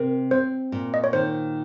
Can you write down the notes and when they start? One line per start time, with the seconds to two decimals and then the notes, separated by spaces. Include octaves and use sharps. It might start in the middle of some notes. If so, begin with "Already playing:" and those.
Already playing: C3 A#4
0.31 C4 C5
0.72 A#2
0.94 D#5
1.04 C#5
1.13 D#3 C5